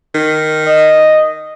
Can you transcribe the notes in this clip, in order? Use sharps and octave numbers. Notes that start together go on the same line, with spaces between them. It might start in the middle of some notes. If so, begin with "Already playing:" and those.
D#3
D#5